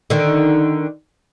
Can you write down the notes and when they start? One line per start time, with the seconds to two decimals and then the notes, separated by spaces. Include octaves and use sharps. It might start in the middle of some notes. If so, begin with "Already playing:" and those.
0.10 D3 D#3